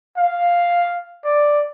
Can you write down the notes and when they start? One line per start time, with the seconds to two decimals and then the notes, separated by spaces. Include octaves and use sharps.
0.17 F5
1.24 D5